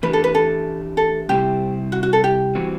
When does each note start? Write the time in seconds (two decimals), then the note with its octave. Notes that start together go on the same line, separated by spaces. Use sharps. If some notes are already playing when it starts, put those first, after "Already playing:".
0.03 E3 A3 D4 G4 B4
0.13 A4
0.24 B4
0.35 A4
0.97 A4
1.29 C3 G3 C4 E4 G4
1.92 F#4
2.03 F#4
2.13 A4
2.24 G4
2.55 E3 G3 C4 F#4